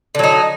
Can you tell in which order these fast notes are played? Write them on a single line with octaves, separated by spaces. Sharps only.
D3 F#3 D#4